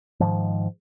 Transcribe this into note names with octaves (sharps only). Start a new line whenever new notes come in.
G#2 D#3 F3